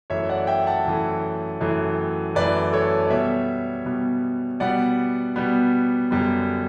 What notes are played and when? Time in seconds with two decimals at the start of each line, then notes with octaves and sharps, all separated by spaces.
0.10 F#2 E3 A3 C#5 E5
0.29 D5 F#5
0.47 E5 G5
0.67 F#5 A5
0.85 F#2 E3 A3
1.61 F#2 E3 A3
2.35 F#2 E3 A3 B4 D5
2.73 A4 C#5
3.06 D5
3.10 B2 G3 B3 C#5 E5
3.86 B2 G3 B3
4.60 B2 G3 B3 D5 F#5
5.36 B2 G3 B3
6.11 F#2 D3 G3 B3